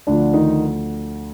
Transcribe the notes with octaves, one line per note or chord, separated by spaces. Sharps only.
D2 D3 F3 D4
D#3 D#4